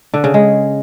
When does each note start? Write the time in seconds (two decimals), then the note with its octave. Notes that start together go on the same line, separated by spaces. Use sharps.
0.14 D3
0.24 C#3
0.34 G#3